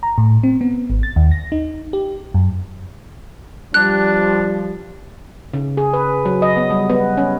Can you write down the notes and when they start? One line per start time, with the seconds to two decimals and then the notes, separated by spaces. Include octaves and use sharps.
0.03 A#5
0.18 A2
0.43 C4
0.61 B3
0.90 G#1
1.03 A6
1.16 D#2
1.31 A#6
1.52 D#4
1.93 G4
2.34 F#2
3.74 F3 G3 D4 F#6
5.54 C#3
5.77 G#4
5.93 B4
6.25 F#3
6.42 D#5
6.57 B3
6.71 G3
6.90 B3
7.17 C#4